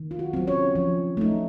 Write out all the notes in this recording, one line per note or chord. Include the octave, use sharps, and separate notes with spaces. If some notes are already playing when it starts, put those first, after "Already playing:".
Already playing: D#3
F4
F#4
F#3 C4
C#4 C#5
F3
A3 D#4